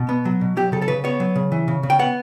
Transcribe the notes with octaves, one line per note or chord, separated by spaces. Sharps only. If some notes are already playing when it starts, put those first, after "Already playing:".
Already playing: B2
B3
F#3
B2
F#3 G4
C#3 A4
A4
C#3 B4
B3 C#5
F#3
C#3
E3
C#3
C#3
G5
B3 F#5